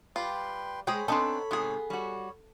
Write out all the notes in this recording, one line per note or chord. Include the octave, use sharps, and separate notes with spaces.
G3 F4 B4 G5 C6
G#3 G#4 C5 C#5 G5 B5
B3 C4 D4 D#4 A4 C5 G#5
G#2 C3 B3 G#4
G3 F#4 C#5